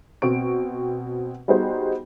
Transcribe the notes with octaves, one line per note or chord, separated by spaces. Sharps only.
B2 C4 C#6 D7
G3 B3 D#4 F#4 G#4 C5